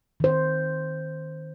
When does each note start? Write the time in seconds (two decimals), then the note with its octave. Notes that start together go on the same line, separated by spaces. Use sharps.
0.20 D#3 C5